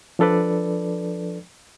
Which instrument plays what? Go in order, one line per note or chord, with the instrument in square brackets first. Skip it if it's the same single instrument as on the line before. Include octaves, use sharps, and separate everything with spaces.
[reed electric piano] F3 D4 A4 B4 D5